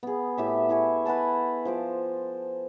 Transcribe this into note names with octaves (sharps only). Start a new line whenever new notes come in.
B3 G#4
A2 G4 E5
E4 G#5 C#6
B4 F#5 G#5 A5
F3 C5 D6